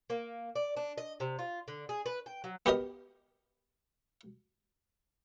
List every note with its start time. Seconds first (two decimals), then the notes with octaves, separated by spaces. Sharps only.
0.10 A#3
0.56 D5
0.77 D4
0.98 D#5
1.20 C3
1.39 F4
1.68 D3
1.89 G#4
2.06 B4
2.26 G5
2.44 F#3
2.66 B3 G4 A#4 D#5